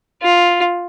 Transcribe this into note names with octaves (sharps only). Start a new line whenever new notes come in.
F4